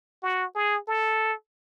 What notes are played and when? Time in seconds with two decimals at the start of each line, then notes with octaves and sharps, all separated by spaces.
0.23 F#4
0.55 G#4
0.88 A4